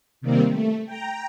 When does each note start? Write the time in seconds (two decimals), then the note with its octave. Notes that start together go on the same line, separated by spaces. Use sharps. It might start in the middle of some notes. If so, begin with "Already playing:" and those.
0.21 C3 D#3 G3 A#3 C4
0.52 A3
0.86 G5 A#5